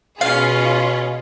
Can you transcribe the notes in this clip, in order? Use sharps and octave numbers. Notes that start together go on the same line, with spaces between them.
B2 C#4 F4 G#4 F5